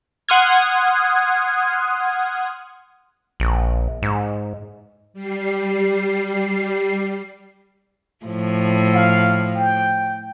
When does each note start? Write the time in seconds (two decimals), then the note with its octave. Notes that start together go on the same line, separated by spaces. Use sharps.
0.29 F#5 C6 D#6 F6 G#6
3.40 A#1
4.02 G#2
5.13 G3 C7
8.26 A2 F3
8.94 F5
9.56 G5